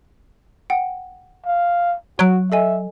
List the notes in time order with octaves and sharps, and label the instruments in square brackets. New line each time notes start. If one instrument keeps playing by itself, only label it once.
[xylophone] F#5 G5
[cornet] F5
[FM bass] F#3 [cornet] F#4 [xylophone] C#6 F#6 D7
[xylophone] A4 D#5 G#5 [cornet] E5